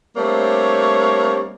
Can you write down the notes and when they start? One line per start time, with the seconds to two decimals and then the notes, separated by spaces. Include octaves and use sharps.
0.16 G3 A3 A#3 C4 D4 C#5